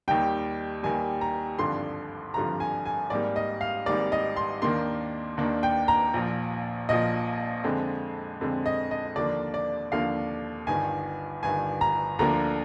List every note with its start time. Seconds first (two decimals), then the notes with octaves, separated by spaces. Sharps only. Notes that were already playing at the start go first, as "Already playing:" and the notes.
0.08 D#2 D#3 G3 G5
0.83 D#2 D#3 G3 G#5
1.21 A#5
1.59 G#1 G2 D3 F3 C6
2.34 G#1 G2 D3 F3 A#5
2.60 G#5
2.86 G#5
3.10 G#1 G#2 G3 A#3 D5
3.36 D#5
3.61 F5
3.86 G#1 G#2 G3 A#3 D5
4.12 D#5
4.36 C6
4.62 D#2 D#3 A#3 D4 C6
5.37 D#2 D#3 A#3 D4
5.63 G5
5.88 A#5
6.14 A#1 A#2 F3
6.89 A#1 A#2 F3 D#5
7.64 F2 D3 G#3 C4
8.41 F2 D3 G#3 C4
8.66 D#5
8.91 D#5
9.16 D#2 D3 F3 A#3 D4 D5
9.54 D5
9.92 D#2 D3 F3 A#3 D4 F5
10.67 G1 G2 D#3 G#5
11.43 G1 G2 D#3 G#5
11.81 A#5
12.19 D2 D3 F3 A#3 D4 A#5